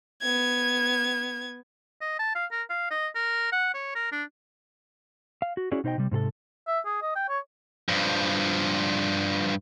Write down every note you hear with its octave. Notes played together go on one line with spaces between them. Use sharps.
B3 G#6
D#5
A5
F5
A#4
F5
D#5
A#4
F#5
C#5
A#4
D4
F5
F#4
C#4 E4 F#4 G#4 C#5 D5
B2 D#4 C5 D#5 G5
C3 G3
G#2 C3 G#4 A4
E5
G#4
D#5
G5
C#5
G2 F3